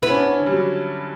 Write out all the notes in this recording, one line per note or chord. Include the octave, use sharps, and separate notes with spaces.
B3 E4
C#4
D4
C#4
D3
G3
F#3